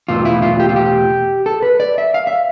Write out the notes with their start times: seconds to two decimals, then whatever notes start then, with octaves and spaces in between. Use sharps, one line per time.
0.08 E2 B2 A3 F4
0.25 E4
0.42 F4
0.60 G4
0.69 F4
0.76 G4
1.46 A4
1.62 B4
1.80 D5
1.98 E5
2.14 F5
2.27 E5